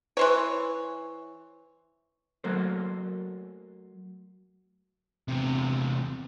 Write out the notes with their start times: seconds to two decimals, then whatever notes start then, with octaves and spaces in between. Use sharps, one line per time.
0.17 E3 C5 C#5
2.44 F#3 A3 A#3 C5
5.28 E2 C3